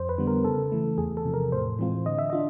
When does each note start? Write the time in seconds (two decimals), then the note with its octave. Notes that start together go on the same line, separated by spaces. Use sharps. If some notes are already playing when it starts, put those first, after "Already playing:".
Already playing: F2 C5
0.09 B4
0.18 D3 G3 B3
0.27 A#4
0.44 C#3 A4
0.72 E3 A3
0.98 E2 G#4
1.17 A4
1.25 C3 F3
1.34 A#4
1.52 A2 C5
1.79 E3 G#3 C4 F4
2.06 D3 D#5
2.19 E5
2.30 D4 F4 D#5